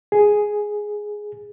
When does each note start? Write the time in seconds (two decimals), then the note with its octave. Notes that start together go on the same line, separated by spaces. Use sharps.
0.12 G#4